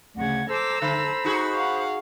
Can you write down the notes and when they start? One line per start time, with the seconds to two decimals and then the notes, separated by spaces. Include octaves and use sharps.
0.16 D2 C#3 F#5 G#6
0.49 A4 C5 A#5 D6 E6
0.82 D3 C5 B5
1.24 D#4 F#4 G#4
1.54 F5 F#5